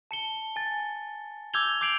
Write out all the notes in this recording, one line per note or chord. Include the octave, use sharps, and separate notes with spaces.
A5 C#7 G7
G#5 A6
D6 E6 G6 G#6 F7 G7
D6 G6 C7 D7 F7 F#7